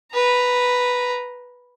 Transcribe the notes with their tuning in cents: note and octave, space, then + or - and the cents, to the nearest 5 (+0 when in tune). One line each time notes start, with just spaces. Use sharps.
B4 +0 A#5 +0